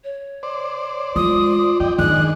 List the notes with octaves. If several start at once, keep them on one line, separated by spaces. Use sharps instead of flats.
C#5
C5 D5
G#3 F4 D#6
B3 D5 D#5 G5
D#3 G#3 D4 D#4 F#6